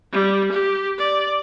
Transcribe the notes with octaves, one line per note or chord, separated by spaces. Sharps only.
G3
G4
D5